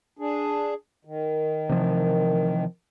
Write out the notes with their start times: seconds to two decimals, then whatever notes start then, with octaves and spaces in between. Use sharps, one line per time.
0.19 D4 G#4
1.05 D#3
1.69 C3 E3 F3